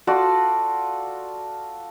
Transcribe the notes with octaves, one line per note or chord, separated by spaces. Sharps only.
F4 F#4 A4 D5